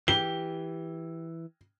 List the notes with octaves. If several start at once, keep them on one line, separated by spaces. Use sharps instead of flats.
E3 G4 G7